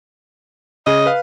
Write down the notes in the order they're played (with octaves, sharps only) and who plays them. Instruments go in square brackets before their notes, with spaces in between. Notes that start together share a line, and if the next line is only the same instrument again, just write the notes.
[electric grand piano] C#3 G#4 [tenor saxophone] D#5
[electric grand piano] B4 F5